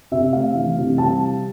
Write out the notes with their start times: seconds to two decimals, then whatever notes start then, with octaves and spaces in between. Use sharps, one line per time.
0.12 C3 E5
0.33 A3 F5
0.55 E3
0.78 C3
0.98 G3 A5